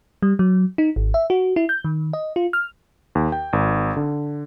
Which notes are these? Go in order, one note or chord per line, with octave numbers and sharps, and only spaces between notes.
G3
F#3
D#4
G#1
E5
F#4
E4
G6
D#3
D#5
F4
F6
D#2
G5
G#1
D3